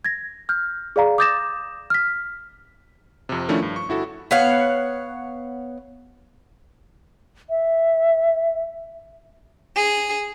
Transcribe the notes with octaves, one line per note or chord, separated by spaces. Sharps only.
G#6 A#6
F6 G6
G#4 D5 F5 A#5
D6 D#6 G6 A6 A#6 E7
F6 B6
F2 C3
D#3 F3 A3 C#4 D4 E4
G2
C#6
G1 E4 F#4 A4
B3 C#5 F5 F#5
E5
G#4